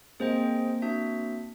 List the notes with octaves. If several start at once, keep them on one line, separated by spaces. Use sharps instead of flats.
A#3 C4 G#4 C5 D#5 G5
D4 F#4 E5